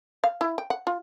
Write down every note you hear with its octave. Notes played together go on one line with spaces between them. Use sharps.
F5
E4
G5
F#5
F4